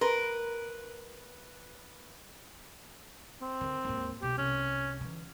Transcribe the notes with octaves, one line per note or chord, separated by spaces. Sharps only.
A#4 B4 C6
C4
D3 D#3
D#2 G#2
B1 G4
C2 C#4
D3 E3